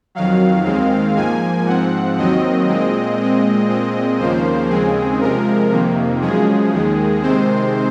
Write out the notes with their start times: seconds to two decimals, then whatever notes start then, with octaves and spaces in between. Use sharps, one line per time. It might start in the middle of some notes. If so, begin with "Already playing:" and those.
0.15 F2 D#3 F#3 F5
0.66 D#2 D#3 G#3 C4
1.16 G#2 F3 A#3 G#5
1.67 G#2 F3 C4 F#5
2.17 D#2 D#3 F#3 C4 D#5
2.68 A#2 G#3 C4
3.19 A#2 G#3 C4
3.69 A#2 G#3 C4
4.19 D#2 C#3 F3 A#3 C5
4.70 D#2 C#3 G#3 C4 G#4
5.21 C3 F3 G#3 A#4
5.71 F2 C3 D#3 A#3
6.21 F#2 C#3 F3 G#3 G#4
6.73 D#2 D#3 G#3
7.22 C3 D#3 G#3 C4 C5